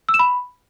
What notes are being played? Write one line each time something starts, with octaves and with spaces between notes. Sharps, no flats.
E6
E7
B5